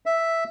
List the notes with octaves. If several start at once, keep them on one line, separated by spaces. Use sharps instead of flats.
E5